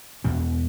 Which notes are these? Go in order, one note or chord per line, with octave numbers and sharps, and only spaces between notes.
E2 B2 B3